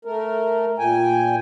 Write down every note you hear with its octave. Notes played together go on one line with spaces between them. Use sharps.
A3 A#4
A#2 G5 G#5